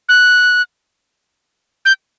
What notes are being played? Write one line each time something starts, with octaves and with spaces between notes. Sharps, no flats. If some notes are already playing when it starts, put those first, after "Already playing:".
F#6
G6